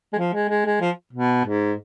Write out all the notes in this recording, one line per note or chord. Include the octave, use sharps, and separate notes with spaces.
G#3
F3
G#3
G#3
G#3
F3
B2
G#2